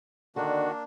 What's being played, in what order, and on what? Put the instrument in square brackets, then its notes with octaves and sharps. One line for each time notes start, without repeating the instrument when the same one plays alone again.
[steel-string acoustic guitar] D3 D5 [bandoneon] D#3 F#4 [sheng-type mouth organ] A#3 D4